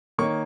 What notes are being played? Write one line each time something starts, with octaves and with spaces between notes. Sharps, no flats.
D#3 A#3 D#4 C#5 C#6